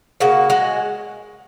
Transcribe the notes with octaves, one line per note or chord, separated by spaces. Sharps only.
C#3 A#3 F#4
G#3 F#4